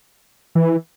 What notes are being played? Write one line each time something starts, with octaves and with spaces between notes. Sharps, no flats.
E3